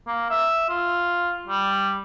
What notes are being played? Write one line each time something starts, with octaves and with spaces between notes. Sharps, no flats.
A#3
E5
F4
G3